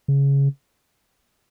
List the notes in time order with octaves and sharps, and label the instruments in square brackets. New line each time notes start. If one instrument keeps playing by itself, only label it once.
[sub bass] C#3